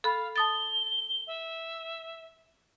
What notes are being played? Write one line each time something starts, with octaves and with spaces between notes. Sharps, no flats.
A4 F5 B5
A5 D#6 A6 G7
E5